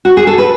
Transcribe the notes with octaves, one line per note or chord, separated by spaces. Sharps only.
F#4
G#4
A4
B4